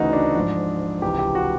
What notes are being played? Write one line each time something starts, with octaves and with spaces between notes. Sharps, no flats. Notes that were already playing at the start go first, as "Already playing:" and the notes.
Already playing: D2 C#3 E3 D#4 F#4
D4
G#2 F3
C#2 C3 E3 G4
G4
F#4